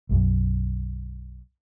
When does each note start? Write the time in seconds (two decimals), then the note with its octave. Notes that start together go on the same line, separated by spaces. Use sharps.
0.09 B1 F#2